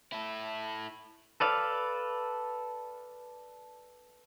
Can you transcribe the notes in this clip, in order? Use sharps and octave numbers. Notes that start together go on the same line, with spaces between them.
E4 A4
A4 B4 D5 F5